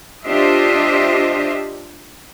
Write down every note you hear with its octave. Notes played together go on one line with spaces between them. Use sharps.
D4 F4 G4 C5 D#5 E5